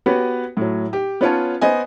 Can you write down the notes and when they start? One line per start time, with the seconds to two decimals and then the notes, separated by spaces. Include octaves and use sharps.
0.06 B3 F#4 G4 B4 C#5
0.57 A2 F#3
0.93 G4
1.21 B3 C#4 F4 C#5 A5
1.61 B3 C5 D#5 G#5